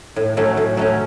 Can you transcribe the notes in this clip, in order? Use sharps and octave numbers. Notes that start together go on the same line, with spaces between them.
A2
F#3 A3 C#4
A2
F#3 A3 C#4